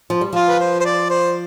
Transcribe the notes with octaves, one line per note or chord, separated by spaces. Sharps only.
F3
G3
F3 F4
B4
C5
C5
D5
C5